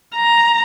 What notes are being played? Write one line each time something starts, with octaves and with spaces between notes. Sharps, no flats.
A#5